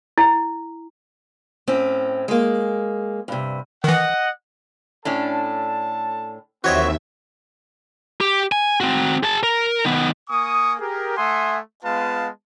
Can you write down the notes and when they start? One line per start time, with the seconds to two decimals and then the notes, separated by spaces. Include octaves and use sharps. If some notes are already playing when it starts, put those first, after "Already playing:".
0.18 E4
1.67 A2 C4 C#4
2.28 G#3 A#3
3.28 G2 C3
3.84 D#3 E3 D#5 F#5
5.05 A2 C#4 D4 A4 A5
6.64 D#2 E3 F#3 C4 F#4 C#5 D#5 E5
8.21 G4
8.52 G#5
8.80 C4 F#4
9.23 G#4 A5
9.43 A#4
9.85 D#3 B3
10.29 A#3 G#5 C#6 D#6
10.80 G4 G#4 A#4
11.16 A3 E5 F#5 G#5 C6 D#6
11.84 G#3 B3 F4 B4 F5 A5